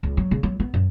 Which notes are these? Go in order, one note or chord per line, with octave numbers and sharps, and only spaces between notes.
C#2
F#3
C#3
F#3
B3
F#2